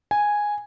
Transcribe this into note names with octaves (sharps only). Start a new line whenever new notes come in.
G#5